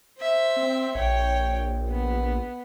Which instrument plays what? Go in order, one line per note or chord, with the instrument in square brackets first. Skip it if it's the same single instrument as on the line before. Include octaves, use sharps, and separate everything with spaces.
[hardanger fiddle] C5 E5
[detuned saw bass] C4
[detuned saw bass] A#1 [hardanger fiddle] C#5 G5
[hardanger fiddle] B3